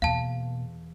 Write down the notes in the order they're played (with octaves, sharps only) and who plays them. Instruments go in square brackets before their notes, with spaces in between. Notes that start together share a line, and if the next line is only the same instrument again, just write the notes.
[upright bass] E2 [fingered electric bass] B2 A#3 [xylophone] F5 A5